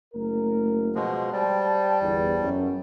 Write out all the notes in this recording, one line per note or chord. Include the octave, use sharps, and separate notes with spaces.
F#1 A3 A#4
B2 F3 G#3
G3 C5 G5 A5
G1 E2
F#2